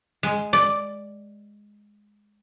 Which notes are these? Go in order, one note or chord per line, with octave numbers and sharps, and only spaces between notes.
G#3
D5